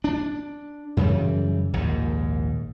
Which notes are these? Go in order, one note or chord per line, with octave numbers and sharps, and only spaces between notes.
D4
F#2 C#3 E3 G3
A#1 D#2 G#2